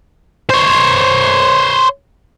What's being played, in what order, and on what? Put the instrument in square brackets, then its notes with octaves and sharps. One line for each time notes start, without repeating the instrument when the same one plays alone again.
[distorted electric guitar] C5 C#5